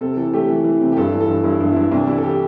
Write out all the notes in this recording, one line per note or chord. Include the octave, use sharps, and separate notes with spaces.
C3 A4
E3 A4
A3 G4
E3
E3
C3
G4
G2 A4
E3
A4
G2
G2 E4
G2 D4
E4
G2 D4
C2 D4
E3 E4
A4
G4